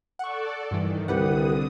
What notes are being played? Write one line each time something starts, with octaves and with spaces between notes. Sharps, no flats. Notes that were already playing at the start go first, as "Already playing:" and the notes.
A4 D5 F#5 C#6
G2 D#3 E3
C2 D3 G4 B4 F#5 D#6